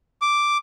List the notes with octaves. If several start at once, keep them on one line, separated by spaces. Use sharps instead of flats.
D6